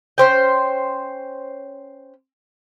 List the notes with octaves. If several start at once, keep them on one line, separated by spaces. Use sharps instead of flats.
C#4 C5 G5